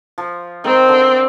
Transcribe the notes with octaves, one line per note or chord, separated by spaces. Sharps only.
F3
D#3 C4
D3